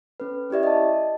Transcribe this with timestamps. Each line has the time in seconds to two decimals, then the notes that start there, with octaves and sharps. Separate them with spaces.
0.20 C#4 A4 B4
0.50 C#4 E4 G4 D5 E5
0.63 D#5 A5